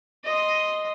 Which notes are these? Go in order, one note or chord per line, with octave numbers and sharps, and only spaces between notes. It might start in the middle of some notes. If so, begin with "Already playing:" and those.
D#5 C6